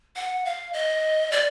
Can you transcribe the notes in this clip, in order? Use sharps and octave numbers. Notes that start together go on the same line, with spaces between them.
F#5
F5
D#5
D5